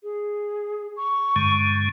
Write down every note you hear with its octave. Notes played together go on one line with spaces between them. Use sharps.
G#4
C#6
G2 D3 G#3